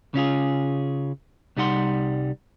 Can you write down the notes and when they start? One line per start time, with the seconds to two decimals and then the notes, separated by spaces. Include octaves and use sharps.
0.14 C#3 C#4 F4 G#4
1.57 C2 G3 D#4 F#5 C6